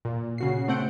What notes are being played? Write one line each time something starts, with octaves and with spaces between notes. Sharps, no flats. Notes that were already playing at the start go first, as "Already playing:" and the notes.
A#2
C#3 F#4 C7
A3 C4 F#5 G6 D7